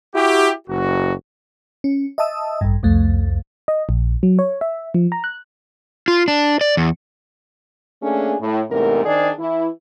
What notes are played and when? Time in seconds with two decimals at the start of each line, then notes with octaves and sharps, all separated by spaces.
0.15 E4 F#4 G4
0.68 F#1 F#4
1.84 C#4
2.18 D#5 E5 A5 D#6 E6
2.61 A1 G2
2.83 C2 F2 A3
3.68 D#5
3.89 A#1
4.23 F#3
4.39 C#5
4.61 E5
4.94 F3
5.12 A#5
5.24 F#6
6.08 F4
6.28 D4
6.61 D5
6.77 E2
8.03 A3 A#3 C#4 D4 G#4
8.41 A2
8.70 E2 G#2 C3 A3 A#4
9.05 D#3 D4 G#4 C5 D5
9.39 E3 E4